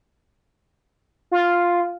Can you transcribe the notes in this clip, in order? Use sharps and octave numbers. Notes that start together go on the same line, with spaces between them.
F4